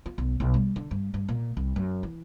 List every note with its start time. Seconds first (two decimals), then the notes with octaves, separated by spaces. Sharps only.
0.06 F4
0.18 B1
0.40 B1
0.54 G3
0.76 D3
0.91 G2
1.14 G2
1.28 A#2
1.57 C2
1.76 F#2
2.03 E3